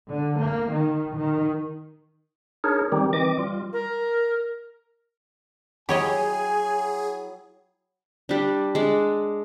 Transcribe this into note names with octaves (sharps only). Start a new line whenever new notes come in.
D3
A#3
D#3
D#3
D4 D#4 G#4 A#4 C#5
D#3 G3 C4 D#4 G4
E3 C4 D#5 D6
G3 F4
A#4
F#3 E4 G4 G#4 C#5 D#5 G5 G#5
G3 D4
G#3 D4